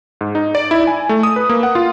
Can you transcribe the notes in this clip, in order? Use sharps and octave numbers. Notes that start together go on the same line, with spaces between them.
G#2
D#4
D5
E4
G#5
A3
D#6
B4
A#3
F#5
F4